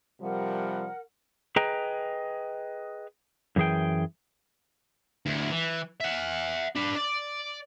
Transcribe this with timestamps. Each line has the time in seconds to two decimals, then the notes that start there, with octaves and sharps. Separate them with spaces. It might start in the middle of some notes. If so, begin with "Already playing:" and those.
0.21 C3 F3 G3 A#4 F#5
1.56 G#4 B4 D#5 G5 A#5
3.56 F#2 E3 G#4 G5
5.26 D2 E4
5.51 E3
6.00 E5 F#5
6.76 D4 B4
6.96 D5